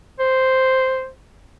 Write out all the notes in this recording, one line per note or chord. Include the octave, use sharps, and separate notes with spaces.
C5